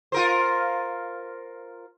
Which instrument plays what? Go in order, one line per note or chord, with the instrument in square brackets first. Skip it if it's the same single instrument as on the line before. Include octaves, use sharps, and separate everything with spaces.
[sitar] F4 A#4 C5